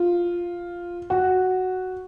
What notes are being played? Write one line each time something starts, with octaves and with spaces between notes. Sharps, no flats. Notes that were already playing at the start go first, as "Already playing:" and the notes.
Already playing: F4
F#4